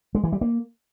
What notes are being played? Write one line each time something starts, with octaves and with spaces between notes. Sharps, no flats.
G#3
E3
G3
A#3